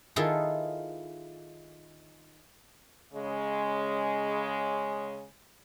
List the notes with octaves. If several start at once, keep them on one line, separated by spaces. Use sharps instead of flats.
D#3 E4 F4 G#4 A4
C#3 G#3